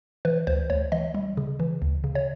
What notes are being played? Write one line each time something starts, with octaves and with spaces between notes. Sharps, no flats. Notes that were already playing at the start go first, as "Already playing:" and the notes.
E3 B4
D2 C5
D2 C#5
E3 D#5
G3
C#3
E3
D2
C#3
C#5